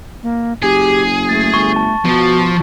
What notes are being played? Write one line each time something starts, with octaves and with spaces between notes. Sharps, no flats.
A#3
F#1 G4 G#4
A3 A6
G1 C#6
A5
B2 F3 F#4